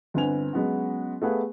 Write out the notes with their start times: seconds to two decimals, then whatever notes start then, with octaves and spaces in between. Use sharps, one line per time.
0.14 G1 C4 B4 G#5 F7
0.53 F#3 G#3 B3 C#4 F#4
1.22 A3 B3 G4 G#4 B4 F5